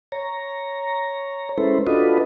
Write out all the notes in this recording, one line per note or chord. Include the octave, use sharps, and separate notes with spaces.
C#5 A#5
G#3 C#4 E4 A4 B4 C5
D4 F4 F#4 A4 B4 D#5